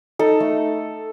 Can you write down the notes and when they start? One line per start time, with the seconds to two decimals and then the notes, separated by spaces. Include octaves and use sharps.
0.19 D#4 A4
0.40 A3